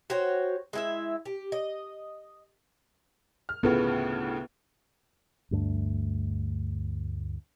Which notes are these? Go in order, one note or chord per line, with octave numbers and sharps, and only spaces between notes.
F#4 C5 C#5 G5
G#3 E4 E5
G4
D#5
F6
D2 A2 C#3 B3 F4 B4
D2 G2 A3 D4